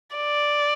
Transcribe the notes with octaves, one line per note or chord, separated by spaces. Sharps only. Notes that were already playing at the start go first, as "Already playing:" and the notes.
D5